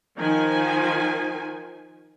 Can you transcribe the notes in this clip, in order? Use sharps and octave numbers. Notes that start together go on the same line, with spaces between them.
D#3 F3 G#5